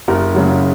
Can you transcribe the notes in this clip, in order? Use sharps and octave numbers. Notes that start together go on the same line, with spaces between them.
F#1 A#4
F#2 C#3 F#3